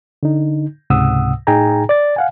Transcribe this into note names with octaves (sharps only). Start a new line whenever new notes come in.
D3 D#4
C#2 G#2 C3 F#5 D#6 E6
A2 D#4 G#4 G5 G#5 A#5
D5 A6
F5 F#5 G#5